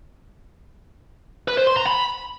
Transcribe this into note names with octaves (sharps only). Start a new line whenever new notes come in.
B4
C5
C6
A#5
B5